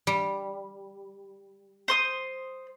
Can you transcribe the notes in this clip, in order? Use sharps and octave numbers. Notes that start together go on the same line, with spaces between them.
G3
C5 C6 D#6